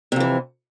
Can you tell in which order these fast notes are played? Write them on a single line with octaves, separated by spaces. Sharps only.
C3 F2 E3